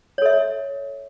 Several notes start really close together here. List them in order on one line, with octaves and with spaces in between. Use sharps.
C#5 A4 E5